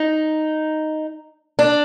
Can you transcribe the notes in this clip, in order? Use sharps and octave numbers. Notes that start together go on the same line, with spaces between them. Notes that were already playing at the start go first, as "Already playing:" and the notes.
Already playing: D#4
D4